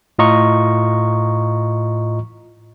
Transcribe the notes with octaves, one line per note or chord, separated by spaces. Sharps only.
A2 F4 D#5 A#5 C#6